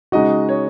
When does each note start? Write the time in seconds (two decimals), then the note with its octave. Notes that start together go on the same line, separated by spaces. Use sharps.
0.12 C#3 G#3 D#4 F#4 D#5
0.49 C#5